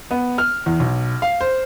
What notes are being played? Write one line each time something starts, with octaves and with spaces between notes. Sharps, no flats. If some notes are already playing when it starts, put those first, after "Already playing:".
B3
F6
E2
B1
F5
C5